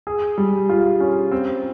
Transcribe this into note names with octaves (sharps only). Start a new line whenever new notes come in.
G#4
G3
F4
C#4
C4